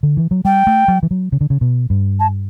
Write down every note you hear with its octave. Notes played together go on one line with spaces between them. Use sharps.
D3
E3
F#3
G3 G5
A3
F#3
E3
F#3
C#3
D3
C#3
B2
G2
A5